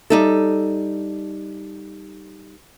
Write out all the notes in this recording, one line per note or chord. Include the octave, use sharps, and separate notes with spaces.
G3 D#4 A4